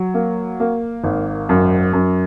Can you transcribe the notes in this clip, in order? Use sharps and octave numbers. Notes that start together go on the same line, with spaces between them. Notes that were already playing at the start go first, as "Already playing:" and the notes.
Already playing: F#3
A#3
A#3
G#1
F#2
F#2